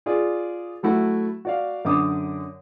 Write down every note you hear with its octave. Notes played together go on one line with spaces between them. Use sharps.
F4 G#4 D5
F#3 A3 E4 F#4
F#4 D5 F5
F#2 D3 D6 D#6